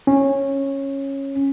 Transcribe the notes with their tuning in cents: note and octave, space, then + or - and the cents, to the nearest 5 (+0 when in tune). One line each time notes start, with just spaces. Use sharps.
C#4 -15